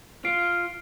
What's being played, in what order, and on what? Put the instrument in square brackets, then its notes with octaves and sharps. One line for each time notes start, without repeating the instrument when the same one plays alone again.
[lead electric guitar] F4 [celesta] C7 D7